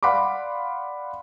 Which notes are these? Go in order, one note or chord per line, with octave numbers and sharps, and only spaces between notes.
D5 F5 F#5 B5 C6 D6